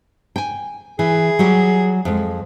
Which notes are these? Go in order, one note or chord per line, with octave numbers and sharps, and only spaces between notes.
G5 G#5
E3 G#4
F#3 G3 G4
F2 G#3